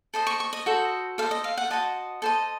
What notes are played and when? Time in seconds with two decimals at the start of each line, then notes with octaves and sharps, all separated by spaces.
0.14 A4 C5 D#5
0.27 C#6
0.40 C#6
0.53 D#5
0.66 F#4 A4 C5
1.18 A4 C5 D#5 F5
1.31 D#5
1.44 F5
1.58 F#5
1.71 F#4 C5 D#5 A5
2.22 A4 C5 D#5